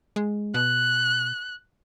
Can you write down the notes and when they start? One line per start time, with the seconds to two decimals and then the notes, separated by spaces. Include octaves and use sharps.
0.16 G#3
0.54 B2 F#6